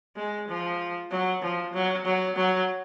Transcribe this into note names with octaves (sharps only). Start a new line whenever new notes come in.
G#3
F3
F#3
F3
F#3
F#3
F#3